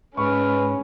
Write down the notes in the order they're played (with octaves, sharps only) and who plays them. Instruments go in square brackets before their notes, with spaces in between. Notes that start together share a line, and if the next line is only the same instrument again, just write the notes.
[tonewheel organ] G#2 [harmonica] G#3 B4 F6 [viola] C#4 [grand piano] C#6